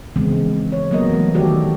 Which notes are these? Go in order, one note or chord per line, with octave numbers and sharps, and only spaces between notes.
C#3 E3 F3 G#3 B3 C4
C#5
F#3 G3 A#3 B3 A#4 D#5
E3 A3
D3 D#3 F#4 G4 A4 D5